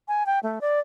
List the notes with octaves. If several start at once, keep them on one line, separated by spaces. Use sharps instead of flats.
G#5
G5
A3
D5